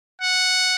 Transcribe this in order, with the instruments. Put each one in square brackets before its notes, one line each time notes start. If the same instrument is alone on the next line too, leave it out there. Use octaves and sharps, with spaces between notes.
[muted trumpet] F#5